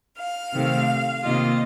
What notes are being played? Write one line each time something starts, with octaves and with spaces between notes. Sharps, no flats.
F5
C3 D#3 A3 C4
C3 D#3 A#3 F4 D#5